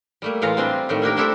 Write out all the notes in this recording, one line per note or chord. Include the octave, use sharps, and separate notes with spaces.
G3 A3 A#3
A2 E3 G#3 F4 F5 A#5
G3 C4 D4 F4 G4
A2 D#3 G3 A3
A#3 D4 G4 A#4
A3 D4 E4 G4 A4 C5